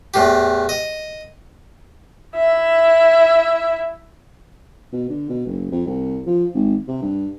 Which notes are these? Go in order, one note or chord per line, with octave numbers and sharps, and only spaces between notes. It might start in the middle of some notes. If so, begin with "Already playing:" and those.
E2 A2 G4
D#5
E4 E5
B2
D3
B2
F#1
F2
C2
F3
G#1
C3
G2